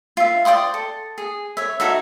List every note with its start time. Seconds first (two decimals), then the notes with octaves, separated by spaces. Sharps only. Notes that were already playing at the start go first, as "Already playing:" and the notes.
0.17 F4 E5
0.45 D5 G5 C6 D#6
0.74 A4
1.18 G#4
1.57 C#5 E5
1.80 D#4 F#4 A4 E5